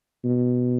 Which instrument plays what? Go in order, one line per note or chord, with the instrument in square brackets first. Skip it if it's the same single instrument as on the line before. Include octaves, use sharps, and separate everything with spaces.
[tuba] B2